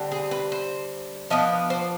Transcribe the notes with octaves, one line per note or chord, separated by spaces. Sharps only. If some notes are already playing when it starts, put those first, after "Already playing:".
Already playing: D3 G3 C4
G#4
B4
C5
F3 B3 D4 D#5
C5